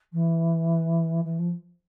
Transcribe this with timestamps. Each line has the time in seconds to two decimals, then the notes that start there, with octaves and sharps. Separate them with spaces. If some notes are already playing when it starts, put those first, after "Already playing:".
0.12 E3
1.24 E3
1.38 F3